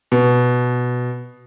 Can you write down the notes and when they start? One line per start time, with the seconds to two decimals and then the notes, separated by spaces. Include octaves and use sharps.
0.12 B2